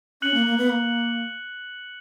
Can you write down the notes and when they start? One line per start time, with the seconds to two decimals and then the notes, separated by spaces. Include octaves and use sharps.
0.22 C#4 F#6 C#7 F#7
0.34 A#3
0.46 A#3
0.58 B3
0.70 A#3